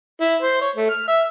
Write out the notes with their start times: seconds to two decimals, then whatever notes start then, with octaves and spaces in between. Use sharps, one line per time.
0.20 E4
0.42 C5
0.61 C#5
0.75 A3
0.90 F6
1.08 E5